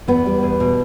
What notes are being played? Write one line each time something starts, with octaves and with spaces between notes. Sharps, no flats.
E2 B3
G3
E2
B2